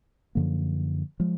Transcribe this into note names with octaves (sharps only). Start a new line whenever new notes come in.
F#2 D3 F3 A#3
F3 G#3